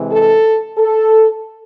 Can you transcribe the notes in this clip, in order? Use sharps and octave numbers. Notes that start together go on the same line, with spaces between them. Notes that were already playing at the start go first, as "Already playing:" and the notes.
Already playing: C3 E3 G#3
A4
A4